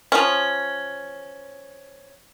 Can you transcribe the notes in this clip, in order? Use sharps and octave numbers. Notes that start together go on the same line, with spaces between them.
F3 C#4